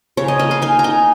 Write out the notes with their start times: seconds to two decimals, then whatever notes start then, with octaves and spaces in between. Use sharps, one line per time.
0.17 C#3 C#5
0.28 D#5
0.39 A#3 D#5
0.51 F5
0.62 D#4 G#5
0.79 A#5
0.84 D#4 G#5